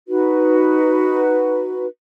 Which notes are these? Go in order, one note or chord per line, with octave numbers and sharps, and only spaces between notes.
D#4 F#4 B4